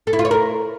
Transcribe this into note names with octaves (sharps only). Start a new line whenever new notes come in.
A4
E4
F4
C#5
A#4